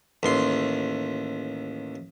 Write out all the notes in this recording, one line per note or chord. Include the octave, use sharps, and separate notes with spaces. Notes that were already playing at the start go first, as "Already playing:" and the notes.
A1 D#2 C6